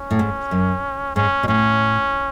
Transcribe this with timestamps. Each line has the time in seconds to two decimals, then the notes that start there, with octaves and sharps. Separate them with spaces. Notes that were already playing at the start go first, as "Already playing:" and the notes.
Already playing: C#4
0.11 A2
0.19 G#2
0.51 F#2
1.16 G#2 C#4
1.43 B2
1.48 A2 C#4